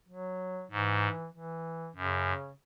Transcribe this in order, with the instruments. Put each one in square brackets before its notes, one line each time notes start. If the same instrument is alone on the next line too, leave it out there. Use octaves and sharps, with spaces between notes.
[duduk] F#3
[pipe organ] G#2 [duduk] E3
[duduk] E3
[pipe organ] F#2 [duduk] C#3